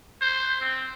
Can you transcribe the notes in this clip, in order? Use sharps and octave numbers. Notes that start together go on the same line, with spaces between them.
C5
C4